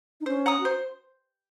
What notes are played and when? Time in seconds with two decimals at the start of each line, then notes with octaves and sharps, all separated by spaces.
0.21 D#4
0.26 C#4 C5
0.46 F#5 A#5 D#6
0.60 F#4
0.65 C5